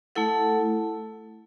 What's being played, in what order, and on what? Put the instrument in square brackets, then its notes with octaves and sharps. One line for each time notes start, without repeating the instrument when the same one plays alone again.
[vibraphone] A3 E4 A4 F#5